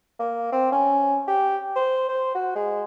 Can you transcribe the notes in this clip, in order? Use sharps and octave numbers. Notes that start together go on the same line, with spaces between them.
A#3
C4
C#4
G4
C5
C5
F#4
G#3